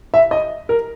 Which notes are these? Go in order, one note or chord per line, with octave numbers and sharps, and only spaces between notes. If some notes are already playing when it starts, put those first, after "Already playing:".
E5
D#5
A#4